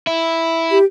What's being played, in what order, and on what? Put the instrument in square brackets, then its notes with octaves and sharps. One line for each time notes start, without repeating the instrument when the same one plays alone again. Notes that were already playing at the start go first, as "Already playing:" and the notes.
[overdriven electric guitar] E4
[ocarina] G4